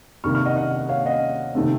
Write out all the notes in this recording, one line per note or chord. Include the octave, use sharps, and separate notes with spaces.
C3 D#3 A#3 C#6 F6
C#6 F6
D#5 F#5
D#5 F#5
C#5 F5
D#5 F#5
C3 D#3 A3 C4